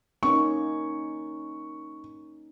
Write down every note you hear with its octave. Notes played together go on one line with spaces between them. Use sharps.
A#3 C#4 D#4 C#6